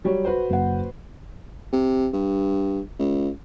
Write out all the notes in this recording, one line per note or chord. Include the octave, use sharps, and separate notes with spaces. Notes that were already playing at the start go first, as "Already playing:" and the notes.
F#3 G3 C#5
F#4 B4 C5
F#1 F#5
C3
G2
C#2